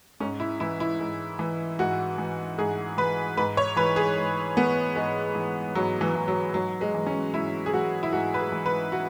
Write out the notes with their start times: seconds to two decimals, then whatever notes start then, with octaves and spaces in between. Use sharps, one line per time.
0.20 G#2 C#4
0.40 E4
0.60 E3 E4
0.80 E4
0.99 G#2
1.39 E3
1.79 G#2 F#4
2.18 E3
2.58 G#2 G#4
2.97 E3 B4
3.37 G#2 B4
3.57 C#5
3.76 E3 B4
3.96 G#4
4.16 G#2
4.57 E3 B3
4.96 G#2 G#3
5.35 E3
5.75 G#2 F#3
6.01 E3
6.15 E3
6.28 F#3
6.54 G#2 F#3
6.81 G#3
6.95 E3
7.07 C#4
7.34 G#2 E4
7.66 G#4
7.73 E3 F#4
8.03 E4
8.13 G#2 F#4
8.34 B4
8.39 G#4
8.52 E3
8.66 B4
8.92 F#4